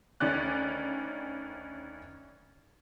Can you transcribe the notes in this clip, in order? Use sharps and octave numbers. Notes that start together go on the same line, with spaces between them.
D2 D#3 C#4 D5 F#6